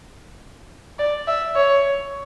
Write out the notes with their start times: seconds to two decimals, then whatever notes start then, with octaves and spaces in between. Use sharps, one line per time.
0.99 D5
1.28 E5
1.56 C#5